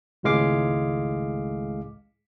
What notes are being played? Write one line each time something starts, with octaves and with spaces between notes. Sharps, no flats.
G#1 C#2 A2 G#3 F5 D6